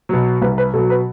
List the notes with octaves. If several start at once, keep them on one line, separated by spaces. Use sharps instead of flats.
B2 F#3
C2 B4
B4
B2 F#3 A4
B4